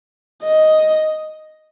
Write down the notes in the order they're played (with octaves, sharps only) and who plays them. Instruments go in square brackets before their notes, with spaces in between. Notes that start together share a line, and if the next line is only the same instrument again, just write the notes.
[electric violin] D#5